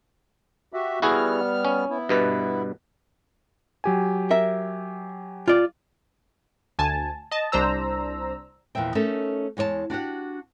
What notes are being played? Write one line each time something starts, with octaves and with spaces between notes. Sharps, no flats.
F#4 G4 E5
G3 B3 E4 F#4 G#4 F6
C#4
B3 E4
G2 B2 B4
F#3 G4 G#5
A#4 E5
F4 D5
D2 G#5 A5
D#5 A5
C2 D4 C5 A#5 E6
E2 A#2 F3 E5 G5
A3 C#4 D#4 A4 A#4 E5
E2 G#3 C#5 D#5 A5
D4 F#4 G4 F#5